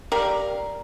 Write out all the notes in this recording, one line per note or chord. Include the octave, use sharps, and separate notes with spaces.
G4 A#4 D5 F5